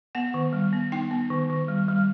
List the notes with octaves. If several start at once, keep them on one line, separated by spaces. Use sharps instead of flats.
B3 F#5
D#3
G3
B3
D#4 G5
B3
D#3
D#3
G3
G3